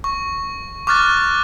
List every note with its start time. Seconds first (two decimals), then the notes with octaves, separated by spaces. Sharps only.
0.04 C#6
0.87 C#6 D6 F6 F#6 A6